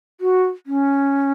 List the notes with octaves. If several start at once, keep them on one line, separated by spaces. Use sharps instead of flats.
F#4
C#4